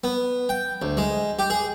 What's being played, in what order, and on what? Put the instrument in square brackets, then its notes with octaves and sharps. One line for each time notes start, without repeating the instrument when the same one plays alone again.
[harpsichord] B3
G5
D2
G#3
G4
G#4